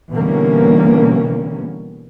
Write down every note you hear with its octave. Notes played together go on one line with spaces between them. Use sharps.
B2 D3 E3 G3 A#3 C#4